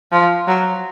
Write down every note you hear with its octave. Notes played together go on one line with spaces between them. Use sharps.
F3
F#3